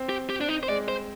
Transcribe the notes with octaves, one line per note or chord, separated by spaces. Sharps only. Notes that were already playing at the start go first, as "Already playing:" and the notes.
Already playing: C4
G4
G4
D4
D#4
C5
G#3 D5
C5